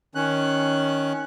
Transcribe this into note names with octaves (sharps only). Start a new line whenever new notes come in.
D#3 C#4 F#6